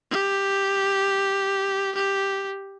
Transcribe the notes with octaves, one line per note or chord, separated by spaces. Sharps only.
G4
G4